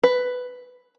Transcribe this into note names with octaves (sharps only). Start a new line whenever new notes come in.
B4